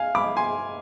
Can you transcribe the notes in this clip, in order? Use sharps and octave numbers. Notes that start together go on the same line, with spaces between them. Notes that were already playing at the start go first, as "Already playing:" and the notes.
Already playing: F5 G#5
B5 D6
G#5 C6